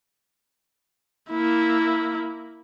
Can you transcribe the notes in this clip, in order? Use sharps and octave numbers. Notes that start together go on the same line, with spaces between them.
A#3 E4